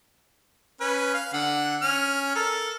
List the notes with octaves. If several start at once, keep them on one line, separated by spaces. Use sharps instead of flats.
C#4 B4
F5
D3 F#5
C#4 F6
A4 A#4